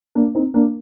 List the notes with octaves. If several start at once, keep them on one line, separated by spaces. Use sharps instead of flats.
A#3 D4
C4 D#4
A#3 D4